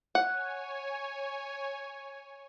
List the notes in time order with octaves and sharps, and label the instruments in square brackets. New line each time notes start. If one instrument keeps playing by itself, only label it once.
[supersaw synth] C#5 G#5 [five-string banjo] F#5